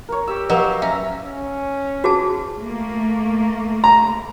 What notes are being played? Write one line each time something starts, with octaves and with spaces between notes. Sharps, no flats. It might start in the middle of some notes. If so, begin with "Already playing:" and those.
A#4 C#5
G4 E6
F#3 A#4 B4 D#5 F5
C#4 E5 A#5
C#4
F#4 G#4 A5
A3 A#3
A#5